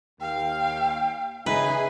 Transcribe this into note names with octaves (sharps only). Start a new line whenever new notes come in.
D#2 F5 G5
C#3 D#4 G#4 B4 E5